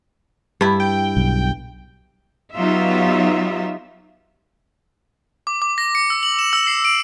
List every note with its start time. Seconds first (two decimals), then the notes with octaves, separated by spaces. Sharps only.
0.61 G2 E4
0.80 G5
1.17 B1
2.54 F#3 B3 D#4 F4 G4 E5
5.47 D6
5.62 D6
5.78 A#6
5.95 C#7
6.10 E6
6.23 F#7
6.39 E7
6.53 E6
6.67 C7
6.85 D7